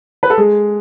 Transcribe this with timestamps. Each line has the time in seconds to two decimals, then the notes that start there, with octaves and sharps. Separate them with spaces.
0.23 B4
0.30 A4
0.38 G#3 G#4